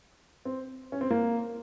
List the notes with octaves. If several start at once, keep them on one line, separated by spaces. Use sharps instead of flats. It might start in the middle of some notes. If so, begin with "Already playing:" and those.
C4
C#4
C4
A#3